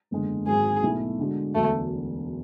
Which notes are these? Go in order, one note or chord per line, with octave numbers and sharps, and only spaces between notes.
F#1 E2 D3 G#3 D4
G#1 G#2 F#3 G#4
B1 B2 A3 E4 A4
D3 G#3 D4 F#4
E1 D2 D3 F#3 A3